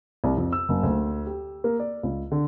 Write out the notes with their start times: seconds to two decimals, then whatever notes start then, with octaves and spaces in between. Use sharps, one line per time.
0.24 C2
0.37 F2
0.53 E6
0.69 F#1
0.83 D2
1.27 G4
1.64 A#3
1.80 D5
2.03 C#2
2.31 D3